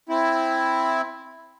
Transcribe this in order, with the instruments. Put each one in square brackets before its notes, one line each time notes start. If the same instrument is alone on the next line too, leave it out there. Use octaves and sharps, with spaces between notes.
[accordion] C4 E4